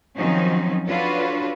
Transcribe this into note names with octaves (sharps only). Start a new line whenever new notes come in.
D#3 F3 F#3 C4 C#4 D#4
D4 F4 F#4 A4 B4 C#5